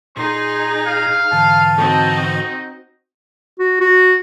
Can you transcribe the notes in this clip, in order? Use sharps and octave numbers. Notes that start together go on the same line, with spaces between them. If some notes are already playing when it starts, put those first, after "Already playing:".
A#2 D#4 G#4 C6 A#6
F5
G#2 D3 E3 A5
C4 D#4 F#4 D#5
F#4
F#4